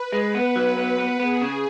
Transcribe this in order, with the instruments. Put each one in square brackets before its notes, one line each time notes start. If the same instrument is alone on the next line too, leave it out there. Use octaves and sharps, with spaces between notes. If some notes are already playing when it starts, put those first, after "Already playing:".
Already playing: [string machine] B4
[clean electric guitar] G#3
[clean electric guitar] B3 [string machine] B4
[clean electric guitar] F#3
B3
B3
[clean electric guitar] B3 [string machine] G#4
[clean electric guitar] C#3